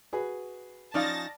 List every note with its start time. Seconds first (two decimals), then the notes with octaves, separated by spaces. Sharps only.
0.13 F#4 G#4 B4
0.94 F3 C#4 D#4 D5 F5 A5 A6 A#6